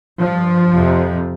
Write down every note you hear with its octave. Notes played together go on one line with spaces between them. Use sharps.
G2 F3
F2 C3